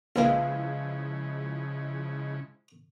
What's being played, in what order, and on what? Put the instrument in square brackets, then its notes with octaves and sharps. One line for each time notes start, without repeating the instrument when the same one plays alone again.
[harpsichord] A#1 A#3 [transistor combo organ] C#3 [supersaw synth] F3 G#3 E4 [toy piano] B4 F5